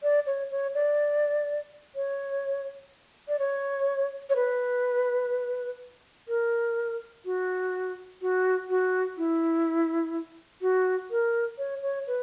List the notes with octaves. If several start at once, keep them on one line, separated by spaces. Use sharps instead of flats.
D5
C#5
C#5
D5
C#5
D5
C#5
C#5
B4
A#4
F#4
F#4
F#4
E4
F#4
A#4
C#5
C#5
B4